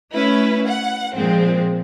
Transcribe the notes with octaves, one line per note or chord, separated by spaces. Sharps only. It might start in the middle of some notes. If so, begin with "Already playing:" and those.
A3 C#4 E4 B4
F#5
A#2 F3 G#3 C4